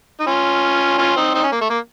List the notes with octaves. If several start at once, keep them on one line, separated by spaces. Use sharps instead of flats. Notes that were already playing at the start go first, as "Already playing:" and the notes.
D#4
C#4 F4
C#4 F4
C4 D#4
C4 D#4
C#4
A#3
A3
A#3